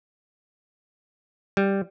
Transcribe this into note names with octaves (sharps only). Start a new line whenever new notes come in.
G3